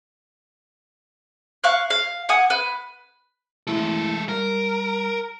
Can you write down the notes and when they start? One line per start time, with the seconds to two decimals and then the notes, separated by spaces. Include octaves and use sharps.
1.64 F5 C#6 F#6
1.90 F5
2.29 F#5 G#5 D#6
2.50 B4
3.67 E3 G#3 A3 E4 A4
4.29 G3 A#4